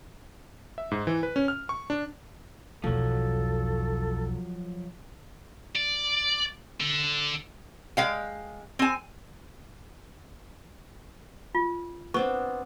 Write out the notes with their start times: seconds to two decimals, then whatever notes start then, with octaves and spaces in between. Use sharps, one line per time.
0.78 E5
0.91 G#2
1.07 E3
1.23 B4
1.36 C#4
1.48 F6
1.69 C#6
1.90 D4
2.84 B1 E2 F3 F#3 A4
5.76 D5
6.81 D3
7.97 G#3 F5 G5
8.79 C4 G#5
11.55 F4
12.14 B3 C4 D4 C#6